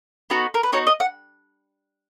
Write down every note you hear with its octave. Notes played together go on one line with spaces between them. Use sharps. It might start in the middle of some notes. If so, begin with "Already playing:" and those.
B3 D#4 F#4
A#4
B4
B3 D#4 F#4 C#5
D#5
F#5